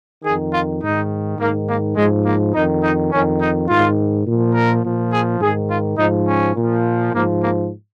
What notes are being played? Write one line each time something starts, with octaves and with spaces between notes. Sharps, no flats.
D#3 G#4
F2
F4
G#2 D#3 D#4
G#2 D#3 A#3
A#3
G#2 F3 G#3
A#3
F2 D#3 D#4
D#4
F2 D#3 C#4
D#4
G#2 D#3 F4
A#2 F3
A#4
A#2 F3
G#4
G#2 D#3 G#4
F4
G#2 F3 D#4
C#4
A#2
F3
G#2 F3 A#3
A#3